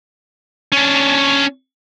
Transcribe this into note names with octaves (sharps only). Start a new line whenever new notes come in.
C#4 D4